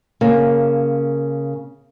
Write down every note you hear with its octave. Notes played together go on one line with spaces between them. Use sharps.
C#3 A#3